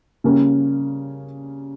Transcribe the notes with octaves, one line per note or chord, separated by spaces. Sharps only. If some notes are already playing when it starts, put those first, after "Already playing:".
C#3 G3 A#3 C#4